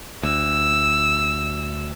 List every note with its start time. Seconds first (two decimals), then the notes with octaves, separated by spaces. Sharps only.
0.23 D2 E6